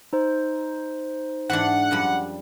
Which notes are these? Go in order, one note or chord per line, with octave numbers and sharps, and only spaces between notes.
D#4 C5
G#2 E3 D4 F#5
F#2 F3 G3